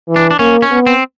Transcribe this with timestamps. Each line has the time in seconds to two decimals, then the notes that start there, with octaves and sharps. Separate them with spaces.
0.08 E3
0.16 D4
0.31 D4
0.39 A#3 C#4
0.62 C#4
0.71 B3
0.87 C4